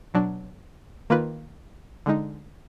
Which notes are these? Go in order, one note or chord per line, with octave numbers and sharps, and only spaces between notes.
B2 F#3 D4
D#3 A#3 F4 B4
D3 G#3 D#4